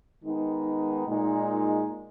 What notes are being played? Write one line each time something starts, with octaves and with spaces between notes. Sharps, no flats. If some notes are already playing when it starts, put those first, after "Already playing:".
D#3 G#3 B3 D#4
A#2 G#3 D#4